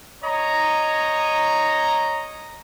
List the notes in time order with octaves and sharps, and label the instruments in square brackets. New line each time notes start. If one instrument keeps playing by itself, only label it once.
[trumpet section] C#5 D#5 A#5